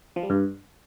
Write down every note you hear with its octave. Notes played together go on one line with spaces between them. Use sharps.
F3
G3
G2